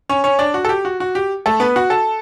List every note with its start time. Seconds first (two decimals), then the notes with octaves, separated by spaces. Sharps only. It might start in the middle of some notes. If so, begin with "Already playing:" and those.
0.09 C#4 C#5
0.24 C#4 C#5
0.39 D4 D5
0.54 F#4
0.65 A4
0.69 G4
0.85 F#4
1.00 F#4
1.15 G4
1.46 A3 A4
1.60 B3 B4
1.76 F#4 F#5
1.90 A4 A5